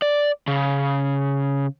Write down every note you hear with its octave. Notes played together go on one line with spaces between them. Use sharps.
D5
C#3